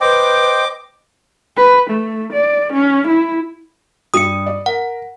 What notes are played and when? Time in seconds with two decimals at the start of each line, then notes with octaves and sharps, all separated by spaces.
0.01 B4 C5 D#5 G5 D6
1.57 B4
1.90 A3
2.33 D5
2.73 C#4
3.08 E4
4.14 G2 G3 D#6 C#7 D#7
4.46 D5
4.66 A#4 F#5